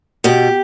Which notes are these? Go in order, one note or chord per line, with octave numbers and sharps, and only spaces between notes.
B2 G4